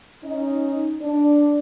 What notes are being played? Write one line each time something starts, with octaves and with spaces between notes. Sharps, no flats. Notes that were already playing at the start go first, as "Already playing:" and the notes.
C#4 D#4
D4